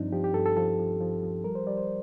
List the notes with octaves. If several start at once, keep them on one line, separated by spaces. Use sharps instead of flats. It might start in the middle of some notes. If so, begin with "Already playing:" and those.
Already playing: G2 F3 C4 D4 D#4
F3 G4
G4
G2 A4
A4
F3 A4
F3
F3
F3
G3 A#4
C5
G3 D5
C5